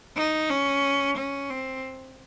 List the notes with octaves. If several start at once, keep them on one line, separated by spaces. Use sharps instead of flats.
D#4
C#4
C#4
C4